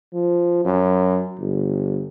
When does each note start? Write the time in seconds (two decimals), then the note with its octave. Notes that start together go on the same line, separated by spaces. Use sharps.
0.14 F3
0.65 F#2
1.39 G1